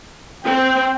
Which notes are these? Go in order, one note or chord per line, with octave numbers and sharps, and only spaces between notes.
C4 G5